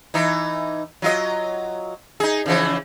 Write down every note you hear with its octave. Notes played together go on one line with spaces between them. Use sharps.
E3 D#4
F#3 F4 D#5
D#4 G#4
C#3 E3 F3